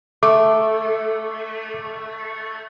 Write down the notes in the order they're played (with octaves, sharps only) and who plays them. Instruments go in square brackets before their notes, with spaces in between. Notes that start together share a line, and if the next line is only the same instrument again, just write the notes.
[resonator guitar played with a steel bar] A3 [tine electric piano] D6